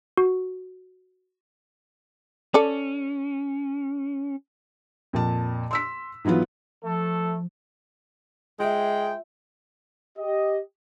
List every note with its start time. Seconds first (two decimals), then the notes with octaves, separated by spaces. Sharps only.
0.17 F#4
2.54 C#4 A4 D5
5.13 F2 A#2 A5
5.71 C6 E6 B6
6.25 G#2 E3 F#3 B3 F4
6.84 F3 A3 A4
8.59 G#3 F4 G#4 C5 E5 G5
10.18 G4 D#5